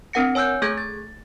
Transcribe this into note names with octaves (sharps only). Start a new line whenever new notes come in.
C4 D4 A#4 F#5 A#6 C#7
C#5 G#5 E6 F#6 G6
A3 G#4 A4 F#6 G#6
A6